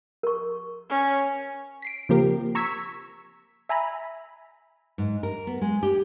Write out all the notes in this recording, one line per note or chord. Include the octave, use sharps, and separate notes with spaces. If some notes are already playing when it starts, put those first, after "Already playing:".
A#4 C#6
C#4
B6 C7 D7
C#3 F3 A#3 C4 G4 A#4
A#5 C#6 E6 G#6 B6
E5 G#5 A#5 B5
G#2
A#4
B3
G#3
G4